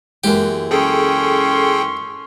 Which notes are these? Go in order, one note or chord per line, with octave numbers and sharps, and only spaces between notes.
F#2 E3 G#3 A#3 G4
C#4 G#4 A4 G5 C6